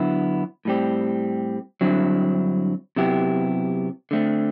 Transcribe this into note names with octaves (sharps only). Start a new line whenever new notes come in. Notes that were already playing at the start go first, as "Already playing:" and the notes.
Already playing: D3 F#3 B3 E4
A2 G3 C4 G4
G2 D3 F#3 C4 E4
C3 F#3 B3 E4 G4
D3 A3 C4